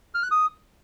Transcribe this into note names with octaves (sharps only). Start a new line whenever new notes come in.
F6
F#6
D#6